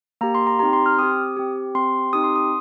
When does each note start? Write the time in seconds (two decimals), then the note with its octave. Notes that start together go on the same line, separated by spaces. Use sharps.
0.21 A#3 G4 A#5
0.35 C6
0.47 A#5
0.59 C4 D#4 G4 A#5
0.73 C6
0.86 F6
0.98 C4 G4 D#6
1.37 C4 G4
1.75 C4 G4 C6
2.13 C4 D#4 G4 D#6
2.24 C6
2.36 D#6